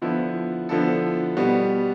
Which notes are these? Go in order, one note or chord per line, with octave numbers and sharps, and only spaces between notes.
D3 F3 B3 E4 A4
D3 F3 B3 E4 A4
B2 G3 B3